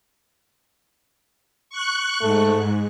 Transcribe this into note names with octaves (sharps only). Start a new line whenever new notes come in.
C#6 F#6
G#2 A3